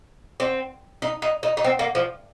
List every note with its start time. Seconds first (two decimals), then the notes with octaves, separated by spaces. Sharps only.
0.40 C4
1.02 D#4
1.22 D#4
1.43 D#4
1.57 D#4
1.64 C4
1.79 A#3
1.95 F3